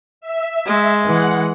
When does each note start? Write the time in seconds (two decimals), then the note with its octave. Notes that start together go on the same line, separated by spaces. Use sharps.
0.21 E5
0.66 G#3
1.05 E3 F#5